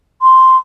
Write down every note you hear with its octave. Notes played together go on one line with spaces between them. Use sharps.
C6